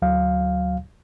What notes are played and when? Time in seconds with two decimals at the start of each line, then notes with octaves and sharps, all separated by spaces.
0.02 D2 F#3 F5